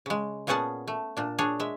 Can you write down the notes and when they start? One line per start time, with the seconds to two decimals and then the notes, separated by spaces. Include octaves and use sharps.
0.06 C#3 G#3
0.47 A#2 B3 C#4 G#4 F#5 A5
0.88 A3
1.17 A#2 D4
1.38 D4 G#4 C#5
1.60 G#3 E5